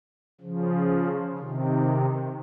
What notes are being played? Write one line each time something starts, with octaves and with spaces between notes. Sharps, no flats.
C#3 F3
C3 D#3